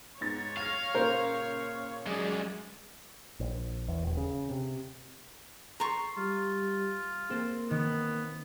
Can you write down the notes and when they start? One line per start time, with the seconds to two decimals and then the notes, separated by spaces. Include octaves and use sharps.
0.21 G#2 B3 C#5 A6
0.57 F5 F6 G#6 A#6
0.95 A#2 C#3 A#3 A#4 C5
2.07 F#2 G#3 G#4 D5
3.40 A#1
3.88 E2
4.03 D#1
4.17 C#3
4.51 C3
5.80 A4 A#5 C6 C#6
6.17 G3 F4
7.30 A#3 C4 A4 C5
7.71 D#3 B3